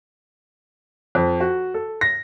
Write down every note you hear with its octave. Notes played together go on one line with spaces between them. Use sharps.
F2
F#4
A4
A#6